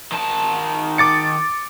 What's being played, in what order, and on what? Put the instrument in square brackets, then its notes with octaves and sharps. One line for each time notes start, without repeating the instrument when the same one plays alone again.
[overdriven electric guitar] D#3 A5
[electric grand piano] D6 A6 C#7